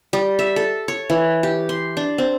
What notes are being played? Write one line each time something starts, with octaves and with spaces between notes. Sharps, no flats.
G3
E5
A4
C#5
E3
G4
C6
D4
C4